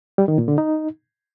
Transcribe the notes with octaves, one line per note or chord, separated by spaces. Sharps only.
G3
D#3
A#2
D3
D#4